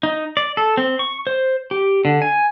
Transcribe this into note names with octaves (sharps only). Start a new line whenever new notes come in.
D#4
D5
A4
C4
C#6
C5
G4
D3
G#5